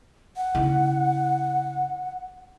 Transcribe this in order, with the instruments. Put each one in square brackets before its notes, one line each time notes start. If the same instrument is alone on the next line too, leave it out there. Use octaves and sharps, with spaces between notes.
[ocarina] F#5
[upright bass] C#3 E4